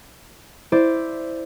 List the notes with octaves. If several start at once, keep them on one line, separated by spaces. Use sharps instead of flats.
E4 C5 D5